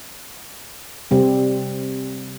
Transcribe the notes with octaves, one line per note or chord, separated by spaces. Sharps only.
C3 G3 C4